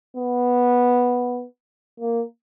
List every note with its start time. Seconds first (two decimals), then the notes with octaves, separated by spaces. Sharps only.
0.17 B3
2.00 A#3